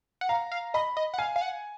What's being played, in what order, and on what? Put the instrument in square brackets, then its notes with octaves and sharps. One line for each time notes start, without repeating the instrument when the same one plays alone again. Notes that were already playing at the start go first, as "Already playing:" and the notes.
[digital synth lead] F#5
[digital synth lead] F5 [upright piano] A#5
[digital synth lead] F5
[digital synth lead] D#5 [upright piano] B5
[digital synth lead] D#5
F#5
[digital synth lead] F5 [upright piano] G#5
[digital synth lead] F5
F#5